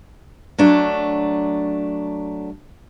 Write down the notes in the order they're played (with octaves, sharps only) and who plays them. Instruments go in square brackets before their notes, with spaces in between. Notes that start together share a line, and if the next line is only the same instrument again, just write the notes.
[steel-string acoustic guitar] F#3 A3 D4